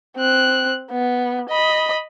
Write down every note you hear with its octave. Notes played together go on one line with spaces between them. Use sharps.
C4 F#6
B3
D#5 B5